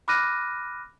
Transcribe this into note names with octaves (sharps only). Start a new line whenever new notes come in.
B5 D6 F6 F#6 A#6 D#7